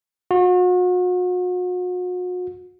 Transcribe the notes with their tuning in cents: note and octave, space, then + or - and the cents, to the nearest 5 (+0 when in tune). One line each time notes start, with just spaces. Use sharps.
F#4 -40